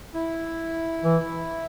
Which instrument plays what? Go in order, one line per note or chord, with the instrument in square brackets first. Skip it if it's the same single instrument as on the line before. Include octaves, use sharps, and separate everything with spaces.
[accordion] E4
[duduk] E3